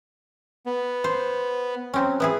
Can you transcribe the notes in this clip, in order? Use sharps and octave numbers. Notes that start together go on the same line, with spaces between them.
B3
C5
F#3 C4 C#4
B3 E4 G#4